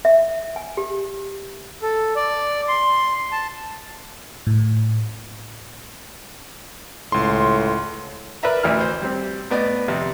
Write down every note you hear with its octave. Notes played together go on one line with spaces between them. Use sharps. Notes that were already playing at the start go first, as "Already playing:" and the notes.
E5
G#5
G4
A4
D5
C6
A5
A2
C#2 A2 C6
A#4 B4 D5 E5 A#5
A1 D2 E3 E4 B5 F6
C5
G3 C4
A2 B3 D5 D#5
F2 C3